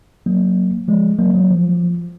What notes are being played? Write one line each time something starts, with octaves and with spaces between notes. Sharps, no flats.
F#3 A#3
F3 G#3
F#3 A#3
F#3
F3